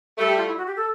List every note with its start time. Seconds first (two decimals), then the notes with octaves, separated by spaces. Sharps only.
0.18 G3 A3 A4
0.28 G4
0.37 F4
0.48 E4
0.57 F#4
0.66 G4
0.76 A4